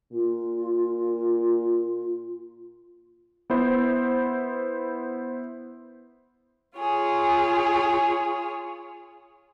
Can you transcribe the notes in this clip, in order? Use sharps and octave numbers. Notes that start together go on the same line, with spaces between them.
A#2 F4
B3 E4 C5
F4 G#4 C#5